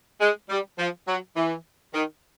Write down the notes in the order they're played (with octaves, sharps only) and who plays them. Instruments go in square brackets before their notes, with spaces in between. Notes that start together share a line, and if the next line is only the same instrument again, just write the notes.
[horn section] G#3
G3
F3
F#3
E3
D#3